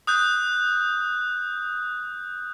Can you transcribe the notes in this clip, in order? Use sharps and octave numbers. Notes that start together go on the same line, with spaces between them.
D#6 F#6 G6